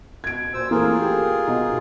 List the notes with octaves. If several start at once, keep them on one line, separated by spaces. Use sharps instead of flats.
B2 G#6 D7
A#2 C5 E6
E3 A3 A#3 F4 G#4 A#4
G4
B2 D#4